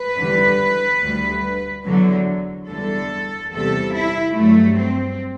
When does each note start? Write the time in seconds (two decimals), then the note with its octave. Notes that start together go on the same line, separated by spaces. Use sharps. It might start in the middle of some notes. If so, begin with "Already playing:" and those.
Already playing: B4
0.17 E2 D3 G3
1.02 D2 D3 G3
1.85 E2 D3 F#3
2.68 E2 D3 G3 A4
3.53 E2 C3 G3 A4
3.95 E4
4.37 G2 F#3 A3
4.79 C4